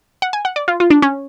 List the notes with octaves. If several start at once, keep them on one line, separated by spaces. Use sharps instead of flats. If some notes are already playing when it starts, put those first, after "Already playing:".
F#5
G#5
F#5
D5
F4
F4
D4
C#4